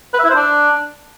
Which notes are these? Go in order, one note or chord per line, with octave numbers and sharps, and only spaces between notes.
B4
E5
E4
C5
D4